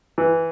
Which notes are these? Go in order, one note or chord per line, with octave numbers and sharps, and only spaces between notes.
E3